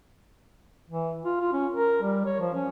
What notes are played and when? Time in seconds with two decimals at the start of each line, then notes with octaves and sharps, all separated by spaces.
0.89 E3
1.24 F4
1.40 F4
1.53 C#4
1.74 A#4
2.02 G3
2.25 C#5
2.40 F3
2.55 C#4